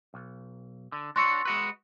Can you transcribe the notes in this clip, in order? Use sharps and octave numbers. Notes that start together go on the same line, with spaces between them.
B1
D3
D4 F#4 C#5 C6 C#6 E6
G#3 F#4 B4